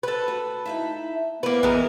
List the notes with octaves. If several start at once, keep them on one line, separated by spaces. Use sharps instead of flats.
A4 B4
F#4
D#4 E4 E5
A#3 B3 E4 B4
A1 E3 G#3 A#4